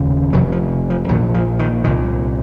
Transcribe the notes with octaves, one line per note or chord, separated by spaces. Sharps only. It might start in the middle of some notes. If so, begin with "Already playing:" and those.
Already playing: F1 D#2 C#3
F1 F2 C3 D#3 F#3
F3
F3
A#1 A#2 D#3 F#3
F3
D#3
C2 A#2 D#3